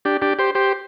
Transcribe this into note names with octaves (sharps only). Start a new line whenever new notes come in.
D4 G4
D4 G4
G4 C5
G4 C5